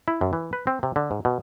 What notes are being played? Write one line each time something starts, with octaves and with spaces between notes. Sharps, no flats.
E4
F#2
E3
B4
C4
C3
D3
G#2
B2